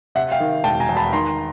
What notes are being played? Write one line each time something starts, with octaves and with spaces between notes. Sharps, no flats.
C3 E5 F#5
F5 G5
D#3
E1 G5 A5
G#5 A#5
E2
A5 B5
D#3 A#5 C6